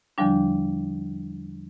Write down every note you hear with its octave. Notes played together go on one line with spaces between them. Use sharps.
E2 D3 F3 G3 D4